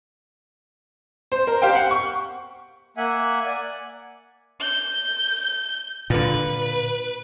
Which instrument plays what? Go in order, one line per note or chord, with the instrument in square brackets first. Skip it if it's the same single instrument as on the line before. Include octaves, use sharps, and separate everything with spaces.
[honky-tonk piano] C5
A#4
G4 C5 F5 G5
F#5
C#6
[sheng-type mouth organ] A#3 E5 F#5 G#5
D5 F#5 G#5
[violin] G6
[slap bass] A#2 D3 [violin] B4